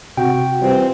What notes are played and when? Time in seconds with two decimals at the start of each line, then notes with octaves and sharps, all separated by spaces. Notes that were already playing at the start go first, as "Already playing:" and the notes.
0.17 C3 F#4 G5
0.60 E3 G3 C4 F4